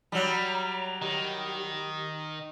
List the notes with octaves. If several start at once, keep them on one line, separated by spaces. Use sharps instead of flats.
F#3 G3 A#5
D#3 G4